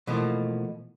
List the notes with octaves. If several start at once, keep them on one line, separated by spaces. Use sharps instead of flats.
B2 E3 F3 A3 A#3